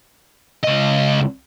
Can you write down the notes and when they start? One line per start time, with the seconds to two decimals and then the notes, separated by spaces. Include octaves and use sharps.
0.63 C#2 D#5